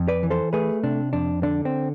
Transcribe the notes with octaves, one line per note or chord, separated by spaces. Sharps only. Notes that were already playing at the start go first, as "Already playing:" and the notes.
Already playing: F2
B4 D5
E3
A4 C5
A3 G#4 B4
C3 D4
F2 D4
D3 D4
C4